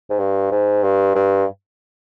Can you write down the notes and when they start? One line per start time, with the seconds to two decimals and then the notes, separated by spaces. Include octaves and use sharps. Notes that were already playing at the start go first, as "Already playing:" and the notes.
0.10 G#2
0.19 G2
0.51 G#2
0.83 G2
1.15 G2